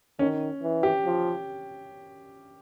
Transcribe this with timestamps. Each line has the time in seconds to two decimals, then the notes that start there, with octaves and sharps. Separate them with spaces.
0.19 D#3 C#4
0.62 E3
0.83 G4
1.05 F3